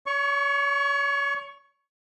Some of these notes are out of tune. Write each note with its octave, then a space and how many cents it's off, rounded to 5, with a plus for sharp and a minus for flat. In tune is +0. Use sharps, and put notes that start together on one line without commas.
C#5 +35 C#6 +0